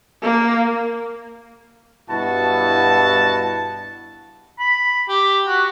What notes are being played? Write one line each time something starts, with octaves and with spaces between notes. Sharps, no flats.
A#3
G2 B2 E4 F#4 A5
B5
G4
F#4